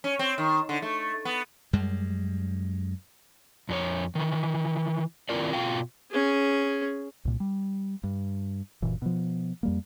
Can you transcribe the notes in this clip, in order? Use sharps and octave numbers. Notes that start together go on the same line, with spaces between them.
C#4
C4
D#3
D3
A3
B3
F#2 G3 G#3
F2 D4 C#5
D#3 E3
D#3 C4 E4 F4 A#4 D5
B2 F3 F4 F#4 F5 G5
C#4 G#4
C2 A#2
G3
G2
F#1 A#2 E3
B2 F3
F2 G3 A#3